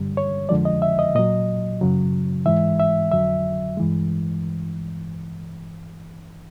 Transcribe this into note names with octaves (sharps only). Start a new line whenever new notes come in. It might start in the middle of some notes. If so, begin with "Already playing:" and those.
Already playing: G2 D3 G3
C#5
F2 D3 F3 G#3 D5
D#5
E5
D#5
A#2 F#3 D#5
F#2 C#3 F#3
G#2 E3 G#3 E5
E5
F2 D3 F#3 E5
G2 E3 G#3